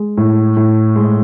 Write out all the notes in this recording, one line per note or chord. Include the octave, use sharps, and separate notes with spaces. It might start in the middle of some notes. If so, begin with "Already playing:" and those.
Already playing: G#3
A2
A2
G#3